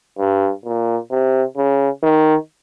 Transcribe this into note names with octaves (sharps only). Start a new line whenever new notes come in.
G2
A#2
C3
C#3
D#3